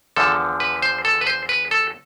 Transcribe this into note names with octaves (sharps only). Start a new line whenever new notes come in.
E2 D3 F3 A4
B4
C5
A4
B4
C5
B4
A4